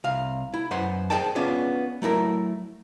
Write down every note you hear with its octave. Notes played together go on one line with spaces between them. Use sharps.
C2 F5
E4
F#2 B4 C5 F#5 B5 C6
G#4 C5 D5 G5 A5
B3 C#4 D4 F4 G#4
F#3 A3 E4 A#4